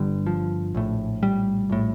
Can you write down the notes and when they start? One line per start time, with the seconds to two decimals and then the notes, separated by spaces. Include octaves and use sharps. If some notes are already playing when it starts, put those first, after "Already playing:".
Already playing: G1 G2 D3 G3
0.27 F3
0.75 A#1 A2
1.23 G3
1.70 A#1 A2